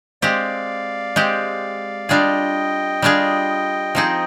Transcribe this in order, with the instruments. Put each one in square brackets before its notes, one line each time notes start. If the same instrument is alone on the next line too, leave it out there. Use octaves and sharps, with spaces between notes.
[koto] G#3 C4 G4 [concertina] D5 F5
[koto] G#3 C4 G4
[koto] G3 D4 F4 G#4 [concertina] D#5 G5
[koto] G3 D4 F4 G#4
F3 C4 D#4 G#4